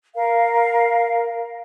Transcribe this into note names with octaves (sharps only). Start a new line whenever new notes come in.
A#4 F5